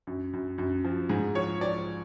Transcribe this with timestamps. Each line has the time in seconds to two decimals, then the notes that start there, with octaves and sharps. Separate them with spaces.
0.07 F#2
0.33 F#2
0.58 F#2
0.84 F3
1.09 G#2 G#4
1.35 F3 C#5
1.61 F3 D5